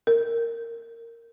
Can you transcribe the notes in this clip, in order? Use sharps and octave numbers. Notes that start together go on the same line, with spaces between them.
A#4